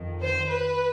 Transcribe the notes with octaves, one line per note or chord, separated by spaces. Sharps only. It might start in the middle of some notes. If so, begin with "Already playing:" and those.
Already playing: F2 D#3
C5
B4